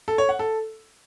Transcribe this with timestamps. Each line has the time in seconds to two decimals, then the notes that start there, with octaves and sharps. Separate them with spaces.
0.08 A4
0.18 C#5
0.29 F#5
0.39 A4